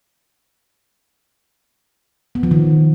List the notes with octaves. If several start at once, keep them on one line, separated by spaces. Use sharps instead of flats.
B3
F3
D#3